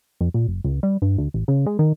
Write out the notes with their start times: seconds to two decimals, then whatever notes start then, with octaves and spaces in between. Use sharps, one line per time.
0.21 F2
0.34 A#2
0.48 F#1
0.64 C#2
0.83 G3
1.02 G2
1.18 D2
1.34 A1
1.48 C#3
1.66 G#3
1.79 D#3